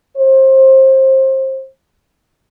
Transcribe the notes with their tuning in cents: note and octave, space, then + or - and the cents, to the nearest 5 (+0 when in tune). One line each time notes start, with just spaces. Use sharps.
C5 +25